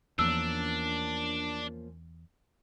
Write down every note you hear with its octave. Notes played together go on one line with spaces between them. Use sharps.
E2 F3 A#3 C#4 D4 E6